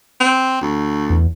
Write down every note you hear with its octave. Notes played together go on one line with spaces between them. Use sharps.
C4
D2
E2